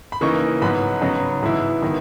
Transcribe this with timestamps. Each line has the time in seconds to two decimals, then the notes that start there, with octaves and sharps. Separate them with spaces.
0.12 B5
0.21 C#3 E3 A#3 D#4 C#6
0.62 G#2 F#3 B3 B5
1.01 C#3 F#3 B3 D#4
1.43 G#2 E3 G#3 B3 E4
1.82 D#3 F#3 B3 E4